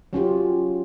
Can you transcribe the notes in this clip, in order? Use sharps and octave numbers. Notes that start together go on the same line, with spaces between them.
F#3 C#4 F4 G4